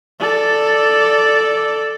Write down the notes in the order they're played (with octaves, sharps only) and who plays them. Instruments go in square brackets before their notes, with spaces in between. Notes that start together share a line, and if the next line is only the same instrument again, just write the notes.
[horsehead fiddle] A4 D5